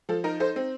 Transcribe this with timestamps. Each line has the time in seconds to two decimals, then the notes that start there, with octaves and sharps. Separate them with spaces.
0.09 F3 A4
0.24 D#4 A#4
0.40 D#4 A4 C5
0.56 C4